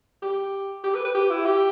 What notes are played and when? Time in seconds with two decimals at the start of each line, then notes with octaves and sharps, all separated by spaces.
0.22 G4
0.84 G4
0.95 B4
1.05 B4
1.15 G4
1.30 E4
1.45 G4